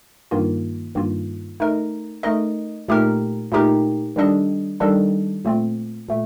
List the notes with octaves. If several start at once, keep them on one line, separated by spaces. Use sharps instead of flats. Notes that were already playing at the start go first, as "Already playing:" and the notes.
G2 D#3 A#3 F4
G2 D#3 A#3 F4
A3 D#4 A#4 D#5
A3 D#4 A#4 D#5
A#2 A3 D#4 G4 A#4
A#2 A3 D#4 G4 A#4
D#3 G3 D4 A4 D#5
D#3 G3 D4 A4 D#5
A#2 A3 C4 F4
A#2 A3